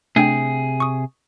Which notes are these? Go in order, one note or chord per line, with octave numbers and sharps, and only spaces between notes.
C3 A3 D4 G#4 G5
C#6 D#6